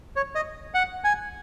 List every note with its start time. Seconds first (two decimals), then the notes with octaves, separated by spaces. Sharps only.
0.16 C#5
0.35 D#5
0.74 F#5
1.04 G#5